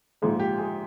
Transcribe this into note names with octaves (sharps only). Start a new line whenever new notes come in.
A#1 G#2 F3
G4
G#4